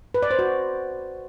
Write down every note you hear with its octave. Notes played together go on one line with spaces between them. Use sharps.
B4
D5
C5
F#4